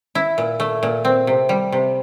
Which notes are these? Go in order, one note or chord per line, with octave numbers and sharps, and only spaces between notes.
E4
A#2
A3
A#2
C4
C3
G3
C3